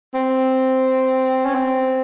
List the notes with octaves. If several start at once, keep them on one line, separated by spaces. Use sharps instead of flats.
C4
C#4
C4